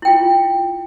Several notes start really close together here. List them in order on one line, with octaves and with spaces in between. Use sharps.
E4 G5 F4